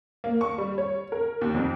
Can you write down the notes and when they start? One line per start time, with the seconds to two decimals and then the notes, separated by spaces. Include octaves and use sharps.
0.24 A#3
0.41 C#6
0.58 G3
0.78 C#5
1.12 A#4
1.41 D#2
1.54 F2